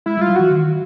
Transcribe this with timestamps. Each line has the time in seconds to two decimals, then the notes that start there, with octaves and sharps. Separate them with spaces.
0.06 G#3 E4
0.17 G3 F4
0.29 F#3
0.36 E3 F#4
0.51 D#3